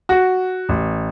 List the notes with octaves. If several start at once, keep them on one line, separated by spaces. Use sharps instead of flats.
F#4
A1